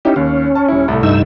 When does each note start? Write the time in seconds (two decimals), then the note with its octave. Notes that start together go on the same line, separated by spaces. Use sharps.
0.05 C#4 D#4 E4 G4
0.16 D#2 C#4
0.55 A5
0.68 D#1 E4
0.88 C2 A2 A3
1.03 G2 D#4 E6